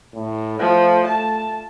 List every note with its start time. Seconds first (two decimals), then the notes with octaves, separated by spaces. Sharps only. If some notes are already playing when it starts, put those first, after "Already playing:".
0.15 A2
0.60 F3 A3
1.06 A5